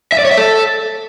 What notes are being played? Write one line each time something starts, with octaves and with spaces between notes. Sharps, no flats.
E5
D5
C#5
E5
A4